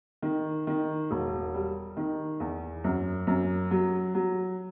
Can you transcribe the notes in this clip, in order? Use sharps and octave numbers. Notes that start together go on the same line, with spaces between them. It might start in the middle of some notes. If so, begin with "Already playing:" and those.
D#3
D#3
E1
G3
D#3
E2
F#2
F#2
F#3
F#3